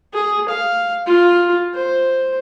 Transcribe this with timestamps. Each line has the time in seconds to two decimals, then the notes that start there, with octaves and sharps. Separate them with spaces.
0.13 G#4
0.49 F5
1.06 F4
1.74 C5